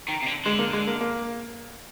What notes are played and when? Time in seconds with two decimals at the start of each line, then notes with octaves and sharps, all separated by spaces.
0.08 D#3
0.22 C3
0.26 D3
0.45 D3 G#3
0.59 A#3
0.73 G#3
0.87 A#3
1.01 A#3